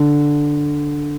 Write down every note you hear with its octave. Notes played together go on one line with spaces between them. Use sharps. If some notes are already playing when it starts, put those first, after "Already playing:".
Already playing: D3